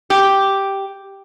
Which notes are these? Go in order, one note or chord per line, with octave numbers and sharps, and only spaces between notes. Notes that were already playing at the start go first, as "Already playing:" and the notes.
G4